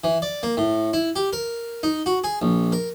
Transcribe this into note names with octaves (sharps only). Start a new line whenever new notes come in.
E3
D5
A#3
A2
E4
G4
A#4
D#4
F#4
G#4
A#1
A#4